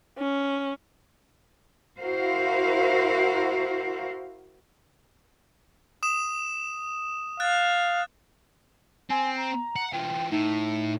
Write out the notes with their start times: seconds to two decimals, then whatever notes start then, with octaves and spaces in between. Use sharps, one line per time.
0.18 C#4
1.98 E4 F#4 A#4 C5 F5
6.03 D#6 E7
7.40 F5 F#6 A6
9.10 C4 G#5
9.37 A#5
9.76 F#5
9.93 E3 F4 G5
10.32 A2 D#4